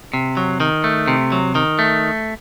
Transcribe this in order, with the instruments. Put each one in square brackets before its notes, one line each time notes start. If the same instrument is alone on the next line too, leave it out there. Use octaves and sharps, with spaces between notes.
[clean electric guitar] C3
F#3
D#3
A3
C3
F#3
D#3
A3